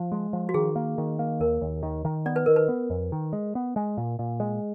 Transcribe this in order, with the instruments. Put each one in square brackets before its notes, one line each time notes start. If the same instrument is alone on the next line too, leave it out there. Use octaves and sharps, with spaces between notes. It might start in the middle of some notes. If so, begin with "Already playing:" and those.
Already playing: [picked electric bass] F3
G#3
F3
[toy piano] F#4
[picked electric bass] D#3 [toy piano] G#4
[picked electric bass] A#3
D#3
A#3
[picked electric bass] D#2 [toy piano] A#4
[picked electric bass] D#2
D#3
D#3
[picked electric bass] B3 [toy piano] D5
[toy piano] B4
[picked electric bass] D#3 [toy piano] A#4
[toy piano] B4
[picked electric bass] B3
F2
D#3
G#3
B3
G#3
A#2
A#2
G#3